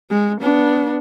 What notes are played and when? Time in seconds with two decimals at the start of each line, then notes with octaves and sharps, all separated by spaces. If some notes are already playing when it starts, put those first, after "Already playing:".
0.11 G#3
0.41 B3 D4